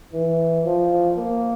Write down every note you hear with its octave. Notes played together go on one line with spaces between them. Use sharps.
E3
F3
A#3